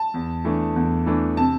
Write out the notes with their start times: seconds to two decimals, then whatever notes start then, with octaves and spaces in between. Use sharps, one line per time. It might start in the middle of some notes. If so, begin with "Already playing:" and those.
Already playing: A5
0.14 E2
0.45 E3 A3 D4
0.76 E2
1.06 E3 A3 D4
1.37 C3 A5